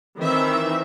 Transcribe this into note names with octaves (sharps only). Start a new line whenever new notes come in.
D#3 E3 C4 E5